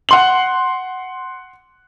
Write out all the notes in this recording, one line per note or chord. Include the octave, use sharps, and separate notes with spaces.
F#5 C6 F#7